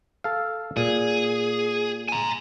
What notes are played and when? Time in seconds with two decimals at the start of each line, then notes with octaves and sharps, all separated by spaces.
0.24 A4 F5
0.77 A#2 G#4
2.09 G#5 A#5